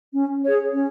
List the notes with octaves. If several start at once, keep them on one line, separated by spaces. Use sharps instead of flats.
C#4
G#4 C#5
C#4